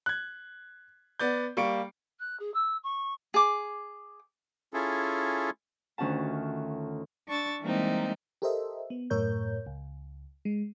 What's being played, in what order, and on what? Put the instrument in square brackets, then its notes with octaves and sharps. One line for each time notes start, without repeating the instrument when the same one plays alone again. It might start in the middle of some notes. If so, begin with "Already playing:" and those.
[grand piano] F#6 G#6
B3 D5 G6
G3 A#3 C#6 C#7 D7
[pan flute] F#6
G#4
E6
C#6
[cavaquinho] G#4 D6
[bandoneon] C#4 E4 F4 G#4 A4
[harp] D2 D#3 C#4 F4 F#5 A5
[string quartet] D4 C#6 E6 A6
E3 G3 G#3 A#3 C4 D#4
[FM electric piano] G4 A4 A#4 C5 D#5 E5
B3
F#2 A2 A#4 C#5 G6
C#2
G#3